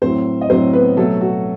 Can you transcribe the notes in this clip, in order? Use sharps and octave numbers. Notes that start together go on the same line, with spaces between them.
A2 F#3 C4 C5
D#5
A2 F#3 C4 C5
B3 B4
B2 F#3 A3 A4
F#4